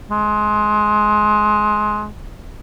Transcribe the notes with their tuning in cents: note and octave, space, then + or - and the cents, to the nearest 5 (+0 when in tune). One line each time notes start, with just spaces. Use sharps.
G#3 +20